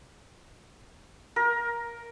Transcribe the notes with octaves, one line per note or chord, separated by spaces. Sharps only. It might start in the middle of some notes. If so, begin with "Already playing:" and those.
A#4